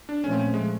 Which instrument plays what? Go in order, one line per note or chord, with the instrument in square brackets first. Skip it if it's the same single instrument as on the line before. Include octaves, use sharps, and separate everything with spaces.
[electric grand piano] D4
[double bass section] A#2 F3 A3 [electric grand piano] C#4
[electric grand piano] C4
C#4
G#3